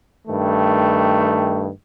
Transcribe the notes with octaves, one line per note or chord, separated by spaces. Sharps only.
G2 D#3 A3